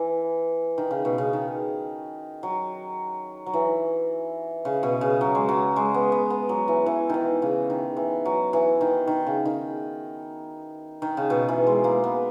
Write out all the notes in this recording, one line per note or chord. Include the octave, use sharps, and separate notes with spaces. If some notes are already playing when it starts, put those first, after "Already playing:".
Already playing: E3
D#3
C#3
B2
C#3
D#3
F#3
F#3
E3
C#3
B2
C#3
F#3
G#3
F#3
G#3
B3
B3
B3
F#3
E3
E3
D#3 E3
C#3
D#3
E3
F#3
E3
D#3
D#3
C#3
D#3
D#3
C#3
B2
E3
G#3
A#3
B3